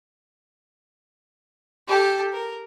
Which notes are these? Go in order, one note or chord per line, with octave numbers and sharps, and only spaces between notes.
G4 A4
A#4